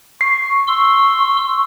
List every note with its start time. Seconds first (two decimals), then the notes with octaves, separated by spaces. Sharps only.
0.21 C#6 C7
0.67 C6 C#6 E6